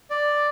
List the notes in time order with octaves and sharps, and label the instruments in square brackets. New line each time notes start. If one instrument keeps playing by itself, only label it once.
[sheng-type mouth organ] D5